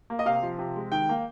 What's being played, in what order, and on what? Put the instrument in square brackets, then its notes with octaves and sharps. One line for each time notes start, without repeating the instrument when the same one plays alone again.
[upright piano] A#3
D#5
C3 F5
F3
C3
G#3
D#3 G5
A#3